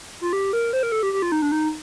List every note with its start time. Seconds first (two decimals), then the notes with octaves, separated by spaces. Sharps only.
0.21 F4
0.33 G4
0.53 A#4
0.73 C5
0.83 A#4
0.92 A4
1.03 G4
1.13 G4
1.22 F4
1.32 D#4
1.42 D4
1.52 D#4